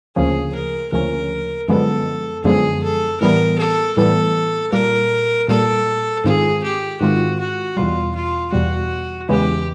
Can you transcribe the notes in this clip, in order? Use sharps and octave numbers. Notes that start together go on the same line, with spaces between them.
D2 C#3 F3 A#3 C#4 G#4
A#4
D2 C#3 F3 A#3 C#4 A#4
F#2 D3 F3 G#3 B3 A4
F#2 D3 F3 G#3 B3 G#4
A4
A2 E3 G3 B3 A#4
A4
A2 E3 G3 B3 A4
A#2 G3 A#3 A#4
A#2 G3 A#3 A4
G#2 D#3 G#3 C4 F4 G#4
G4
G#2 D#3 G#3 C4 F4 F#4
F#4
E2 B2 G3 F4
F4
E2 B2 G3 F#4
E2 C#3 E3 G#3 B3 G4